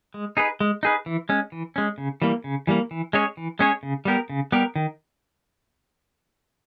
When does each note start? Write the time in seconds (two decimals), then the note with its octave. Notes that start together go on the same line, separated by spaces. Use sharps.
0.14 G#3
0.37 D#4 G#4 B4
0.60 G#3
0.83 D#4 G#4 B4
1.06 E3
1.29 G#3 C#4
1.52 E3
1.76 G#3 C#4
1.98 C#3
2.22 E3 G3 A#3
2.44 C#3
2.67 E3 G3 A#3
2.91 E3
3.13 G#3 C#4 G#4 C#5
3.37 E3
3.59 G#3 C#4 G#4 C#5
3.83 C#3
4.05 G3 B3 G4 A#4
4.29 C#3
4.52 G3 B3 G4 A#4
4.76 D#3